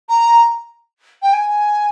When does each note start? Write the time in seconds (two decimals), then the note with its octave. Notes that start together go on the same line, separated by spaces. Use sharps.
0.09 A#5
1.22 G5
1.33 G#5